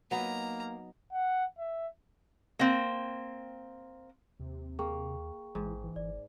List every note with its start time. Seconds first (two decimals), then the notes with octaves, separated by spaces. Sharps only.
0.11 F#3 A#3 B3 D#4 A#5
1.12 F#5
1.59 E5
2.59 A#3 C4
4.40 D#2 C3
4.79 A#3 G#4 G5 C#6
5.55 A1 G#2 E3
5.84 E3
5.96 G1 D5